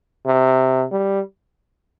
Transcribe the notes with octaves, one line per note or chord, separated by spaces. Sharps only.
C3
G3